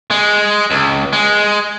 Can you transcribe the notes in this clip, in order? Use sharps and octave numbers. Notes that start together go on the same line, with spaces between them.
G#3
C#2
G#3